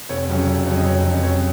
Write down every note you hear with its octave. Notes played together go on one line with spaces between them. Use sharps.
F1 C#5
F2 C#3 F#3
F1
F2 C#3 F#3
D#5
F1 C#5
F2 C#3 F#3
F1 C#5